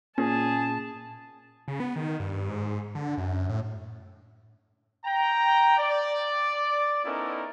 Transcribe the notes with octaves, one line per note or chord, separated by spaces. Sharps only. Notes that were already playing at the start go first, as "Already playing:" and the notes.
A#2 C#4 G#4 A5
C#3
B3
D#3
G2
G#2
D3
F#2
A2
G5 A#5
D5
B3 C#4 D#4 E4 A4 A#4